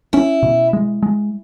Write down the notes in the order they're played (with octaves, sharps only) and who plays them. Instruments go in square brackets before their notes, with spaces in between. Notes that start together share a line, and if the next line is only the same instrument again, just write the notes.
[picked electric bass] C#4 [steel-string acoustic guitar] E4
[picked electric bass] B2
G#3
G#3